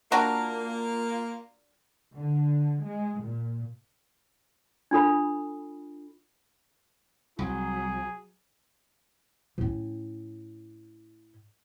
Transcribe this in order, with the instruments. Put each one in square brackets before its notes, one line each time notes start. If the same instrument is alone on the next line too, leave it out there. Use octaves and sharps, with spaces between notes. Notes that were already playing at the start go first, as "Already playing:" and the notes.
[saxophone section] A#3 F4 [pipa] D4 F#4 A#4
[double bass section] D3
G#3
A#2
[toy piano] D4 F4 A4 B5
[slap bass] C2 [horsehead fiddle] F#3 [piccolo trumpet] G#4
[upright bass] A2 C#4